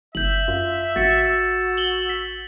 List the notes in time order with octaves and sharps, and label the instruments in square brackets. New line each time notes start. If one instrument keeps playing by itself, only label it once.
[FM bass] F#1 [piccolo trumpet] E5 [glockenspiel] G6 F#7
[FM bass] F#2 [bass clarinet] F4
[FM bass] A1 [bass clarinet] F#4 [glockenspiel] A6 C#7
[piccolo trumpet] E6
[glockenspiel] F#7 G7
B6